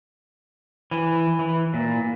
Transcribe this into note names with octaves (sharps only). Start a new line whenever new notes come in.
E3
E3
A#2